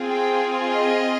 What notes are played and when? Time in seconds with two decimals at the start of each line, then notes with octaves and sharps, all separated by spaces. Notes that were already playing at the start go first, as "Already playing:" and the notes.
Already playing: C4 F4 G#4
0.09 G5
0.69 D#5